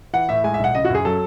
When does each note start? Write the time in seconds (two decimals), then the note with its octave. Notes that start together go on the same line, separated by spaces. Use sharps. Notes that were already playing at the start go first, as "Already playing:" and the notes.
0.13 E3 F#5
0.29 A2 E5
0.44 G#3 G#5
0.54 E5
0.59 B1 F#5
0.75 C#3 D#5
0.85 F#4
0.90 F#2 G#4
1.05 F#3 A4